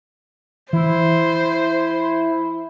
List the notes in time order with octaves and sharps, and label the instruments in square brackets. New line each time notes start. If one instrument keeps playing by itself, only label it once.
[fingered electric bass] E3 [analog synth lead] E4 [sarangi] C5